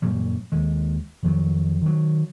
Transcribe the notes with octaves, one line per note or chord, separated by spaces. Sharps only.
F#2 A#2 F#3 G3
D#2 G#3
F2 D#3 F#3
D#3 F#3